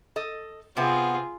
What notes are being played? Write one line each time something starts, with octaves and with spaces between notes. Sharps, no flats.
A4 D#5
C3 B3 C4 F4 G#4